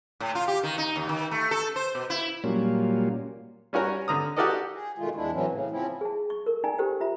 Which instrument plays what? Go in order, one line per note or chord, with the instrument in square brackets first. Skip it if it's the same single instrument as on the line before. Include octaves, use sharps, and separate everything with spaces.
[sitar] A2
F4
G4
D#3
D#4
D#2
D#3
A3
A4
C5
B2
E4
[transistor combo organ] A#2 F#3 G3 A#3 C#4 F4
[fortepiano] G3 C#4 F#4 A#4 C#5
D3 A#5 D#6
F#4 G4 A4 A#4 D5 D#5
[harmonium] G#4
B2 D#3 G#3 A3 F4
E2 G#3 D4 E4
A2 E3 F#3 C4 C#4
A2 C#3
F3 C4 C#4 E4
[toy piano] G#4 A5
C#6
A4 A#4
D#4 D5 G5 G#5 A#5
G4 A4 C5 G5
F4 E5 A#5